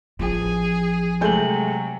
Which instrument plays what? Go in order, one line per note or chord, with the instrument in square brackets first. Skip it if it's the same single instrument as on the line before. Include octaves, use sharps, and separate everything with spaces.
[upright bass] A1 F3 [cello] G#4
[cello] C3 F#3 [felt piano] G#3 A3 G6 [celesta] G#5 F#7